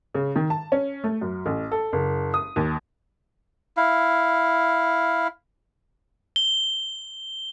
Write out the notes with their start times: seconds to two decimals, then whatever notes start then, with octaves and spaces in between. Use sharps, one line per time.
0.15 C#3
0.36 D#3
0.50 A5
0.72 C#4
1.04 A3
1.21 F#2
1.46 A1
1.72 A4
1.93 F#1
2.34 D#6
2.56 D#2
3.77 E4 F5
6.36 G7